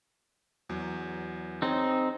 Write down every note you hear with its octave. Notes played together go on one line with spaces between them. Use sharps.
E2 F#3
C4 D#4 G#4 C#5